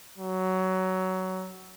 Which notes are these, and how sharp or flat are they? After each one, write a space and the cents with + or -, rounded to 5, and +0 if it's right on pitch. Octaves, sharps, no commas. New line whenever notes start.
F#3 +15